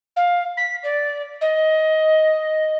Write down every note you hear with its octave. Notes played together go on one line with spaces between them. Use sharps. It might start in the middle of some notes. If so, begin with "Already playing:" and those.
F5
B6
D5
D#5